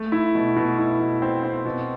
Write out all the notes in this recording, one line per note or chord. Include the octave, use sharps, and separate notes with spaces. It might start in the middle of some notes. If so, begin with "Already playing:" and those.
Already playing: A3
E4
B2
B2
E4
B2
C4
C4
B2